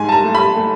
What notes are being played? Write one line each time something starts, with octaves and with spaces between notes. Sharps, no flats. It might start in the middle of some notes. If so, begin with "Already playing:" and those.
Already playing: G#2 G#5
A5
A#5
A3
B5
A3